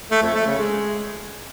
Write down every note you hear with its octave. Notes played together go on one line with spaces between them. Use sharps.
A3
F2
A3
C#3
G#3